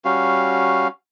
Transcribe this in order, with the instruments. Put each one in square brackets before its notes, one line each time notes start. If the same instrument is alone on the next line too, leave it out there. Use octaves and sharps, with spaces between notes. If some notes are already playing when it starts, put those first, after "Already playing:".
[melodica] G3 C#4 F#4 F5